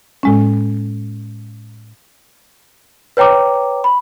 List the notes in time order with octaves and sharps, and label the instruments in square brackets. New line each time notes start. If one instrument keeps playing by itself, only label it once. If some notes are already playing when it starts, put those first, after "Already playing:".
[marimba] A2 G#3 C#4
[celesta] B4 C#5 G5 A#5 D6
B5